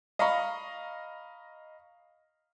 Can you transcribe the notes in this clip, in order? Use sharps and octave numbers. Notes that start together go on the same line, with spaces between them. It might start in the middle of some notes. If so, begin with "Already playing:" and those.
D#5 F5 A#5 B5 C#6